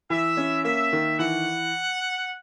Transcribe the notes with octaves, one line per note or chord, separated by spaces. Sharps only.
E3 E5
C#4
A#3 E5
D#3
E3 F#5